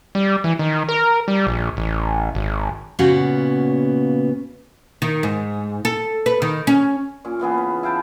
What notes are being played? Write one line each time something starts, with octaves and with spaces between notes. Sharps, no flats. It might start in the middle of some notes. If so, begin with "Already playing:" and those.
G3
E3
D#3
A#4
G3
A#1
A1
G#1
A#2 C#3 B3 C#4 F#4 F5
D#3
G#2
A4
B4
D#3
C#4
A#2 C#4
C#3 E3 B3 G#4
B5
E4 F5 G5 A5